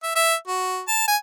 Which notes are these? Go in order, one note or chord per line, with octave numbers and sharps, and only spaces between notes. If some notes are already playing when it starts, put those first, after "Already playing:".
E5
E5
F#4
A5
G#5